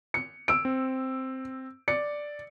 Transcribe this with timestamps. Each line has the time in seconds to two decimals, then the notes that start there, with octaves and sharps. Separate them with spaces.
0.14 C#7
0.48 E6 D7
0.65 C4
1.88 D5 C#7